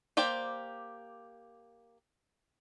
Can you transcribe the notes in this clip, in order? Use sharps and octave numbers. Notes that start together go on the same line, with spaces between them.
A#3 G4 C5 D5 G5